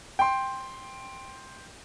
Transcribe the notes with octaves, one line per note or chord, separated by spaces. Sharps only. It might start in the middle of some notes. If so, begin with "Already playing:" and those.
G5 C6